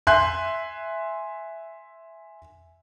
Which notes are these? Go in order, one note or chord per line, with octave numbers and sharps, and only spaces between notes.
E5 G#5 C6 F#6